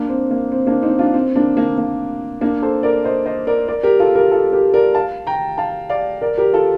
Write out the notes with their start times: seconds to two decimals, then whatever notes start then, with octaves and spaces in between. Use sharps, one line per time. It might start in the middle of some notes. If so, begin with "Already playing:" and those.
Already playing: A#3 D4
0.09 C4
0.31 A#3
0.52 C4
0.67 A#3 D4
0.82 C4 D#4
0.99 D4 F4
1.14 C4
1.36 A#3 D4
1.57 A#3 D4
1.78 A#3
2.41 A#3 D4
2.62 A4 C5
2.83 A#4 D5
3.04 C5 D#5
3.26 C5 D#5
3.47 A#4 D5
3.68 A#4 D5
3.83 G4 A#4
4.00 F4 A4
4.15 G4 A#4
4.31 F4 A4
4.53 G4 A#4
4.74 A#4 D5
4.95 F5 A5
5.27 G5 A#5
5.58 F5 A5
5.89 D5 F5
6.22 A#4 D5
6.38 G4 A#4
6.53 F4 A4